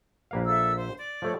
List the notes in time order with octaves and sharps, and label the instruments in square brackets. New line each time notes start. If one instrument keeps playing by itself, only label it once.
[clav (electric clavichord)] A#1 A#3 F5 [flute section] B4
[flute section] A4 E5 E6
C5
D5
[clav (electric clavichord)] F3 A3 C#5